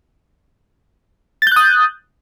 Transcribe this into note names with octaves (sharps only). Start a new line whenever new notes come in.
D#6 F#6 G6 A6